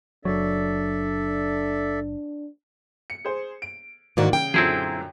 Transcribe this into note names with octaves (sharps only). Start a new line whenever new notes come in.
F#1 F#3 D4 A4 D5 E5
C#7
G#4 C5
D7
G#2 D#3 E3 A#3 F#4 D5
C#3 G5
F#2 A#2 D3 C4 E4 G#4